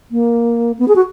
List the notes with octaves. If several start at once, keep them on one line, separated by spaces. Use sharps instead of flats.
A#3
B3
G#4
F#4